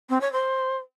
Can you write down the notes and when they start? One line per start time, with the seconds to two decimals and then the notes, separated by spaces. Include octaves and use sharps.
0.09 C4
0.21 C#5
0.32 C5